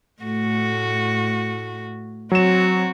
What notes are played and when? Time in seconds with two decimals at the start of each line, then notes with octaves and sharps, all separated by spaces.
0.22 A2 A3 F#4
2.32 F#3 C4 F#4 E7